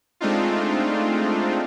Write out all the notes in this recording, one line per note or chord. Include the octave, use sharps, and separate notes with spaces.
G#3 A3 C4 D4 D#4 F4